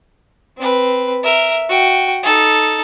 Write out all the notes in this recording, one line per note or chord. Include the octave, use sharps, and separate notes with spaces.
C4 B4
A#4 E5
F#4 G5
D#4 A4